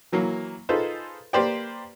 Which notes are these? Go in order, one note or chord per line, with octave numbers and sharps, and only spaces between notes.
E3 F#3 A#3
D#4 F4 G#4 A4 B4 C5
A#3 G4 B4 C5 D5 G5